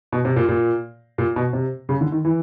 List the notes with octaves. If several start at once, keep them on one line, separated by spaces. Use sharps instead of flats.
B2
C3
A#2
A#2
A#2
B2
C3
C#3
D3
D#3
E3